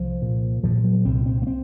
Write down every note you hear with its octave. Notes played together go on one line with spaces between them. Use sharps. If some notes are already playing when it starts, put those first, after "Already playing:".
Already playing: C2 F3
A#2
A#2 F3
F#3
C2 C4
C4
A#3
C4